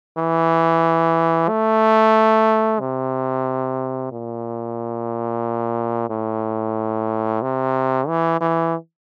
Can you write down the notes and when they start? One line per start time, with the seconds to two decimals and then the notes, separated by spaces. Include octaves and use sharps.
0.17 E3
1.49 A3
2.80 C3
4.12 A#2
6.10 A2
7.42 C3
8.08 E3
8.41 E3